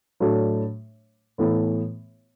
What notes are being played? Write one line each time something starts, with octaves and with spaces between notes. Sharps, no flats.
A2 F#3 A3 D4
A2 E3 B3 E4 A4